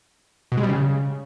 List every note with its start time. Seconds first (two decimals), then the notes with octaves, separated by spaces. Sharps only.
0.52 B2
0.57 G#3
0.63 G3
0.69 C#3